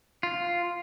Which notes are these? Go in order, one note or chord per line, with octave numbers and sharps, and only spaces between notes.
F4